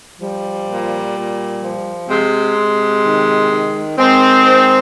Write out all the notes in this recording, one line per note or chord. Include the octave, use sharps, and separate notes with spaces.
F3 G3
A#2
A#2
F3
C3 G#3
C3
D#3
D#3
D#3 G#3 C4
D#3